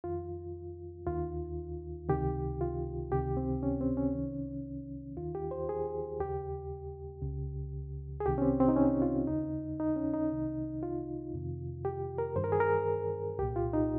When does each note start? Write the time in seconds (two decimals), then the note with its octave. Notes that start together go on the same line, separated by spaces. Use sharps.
0.04 F2 D#3 F4
1.07 D#2 D#3 F4
2.09 C#2 C3 D#3 G4
2.61 F4
3.12 C#2 C3 D#3 G4
3.37 C4
3.63 C#4
3.81 C4
3.97 C#4
4.14 C2 C3 D#3
5.17 D#2 D#3 F4
5.35 G4
5.51 C5
5.69 G#4
6.20 D#2 C#3 G4
7.22 C#2 C#3
8.20 G#4
8.26 C2 C3 D#3 G4
8.38 C#4
8.42 C4
8.60 C4
8.68 D#4
8.76 C#4
9.02 F4
9.27 D#2 C#3 D#4
9.80 D#4
9.96 C#4
10.14 D#4
10.30 C2 C3 D#3
10.83 F4
11.33 F2 C3 D#3
11.85 G4
12.18 A#4
12.36 G2 D#3 C5
12.44 A#4
12.52 G#4
12.60 A#4
13.39 C2 A#2 G4
13.56 F4
13.73 D#4